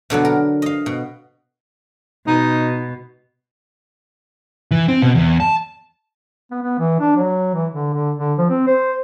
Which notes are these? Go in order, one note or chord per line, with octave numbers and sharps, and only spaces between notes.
B2 D3 F#3 B3
A#4
D#5 F5
B2
B2 D#4
E3
C4
B2
E2
A5
B3
B3
E3
D4
F#3
E3
D3
D3
D3
F3
C4
C5